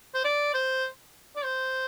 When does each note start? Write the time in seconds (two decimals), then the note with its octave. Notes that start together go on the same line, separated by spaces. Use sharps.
0.14 C5
0.24 D5
0.54 C5
1.36 D5
1.44 C5